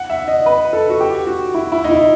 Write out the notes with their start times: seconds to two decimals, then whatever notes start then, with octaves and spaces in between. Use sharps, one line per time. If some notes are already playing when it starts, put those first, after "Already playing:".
Already playing: F#5
0.10 E5
0.28 D#5
0.46 B4
0.73 A4
0.90 F#4
1.00 G4
1.27 F#4
1.54 E4
1.72 E4
1.84 D#4
1.91 E4